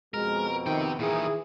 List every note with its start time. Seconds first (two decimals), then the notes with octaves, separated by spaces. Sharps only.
0.14 F2 B2 G#3 A#4
0.66 C3 D#3 G5
0.99 A#2 D#3 E3 E4 G#4